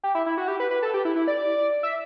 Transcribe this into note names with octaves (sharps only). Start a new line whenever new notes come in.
G4
E4
E4
F#4
G4
B4
B4
A4
G4
E4
E4
D5
E5